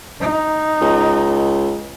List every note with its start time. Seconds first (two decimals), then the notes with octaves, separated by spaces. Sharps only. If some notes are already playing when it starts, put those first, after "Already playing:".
0.21 D#4
0.81 C#2